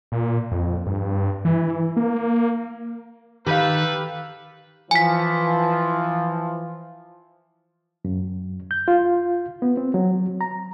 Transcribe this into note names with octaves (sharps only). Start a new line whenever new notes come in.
A#2
F2
G2
E3
A#3
D#3 G4 A4 B4 F5
E3 F3 G#5 B6
F#2
G6
F4
B3
C4
F#3
A#5